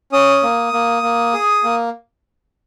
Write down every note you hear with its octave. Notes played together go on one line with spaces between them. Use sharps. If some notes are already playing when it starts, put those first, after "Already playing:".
C#4 D#6
A#3
A#3
A#3
G#4
A#3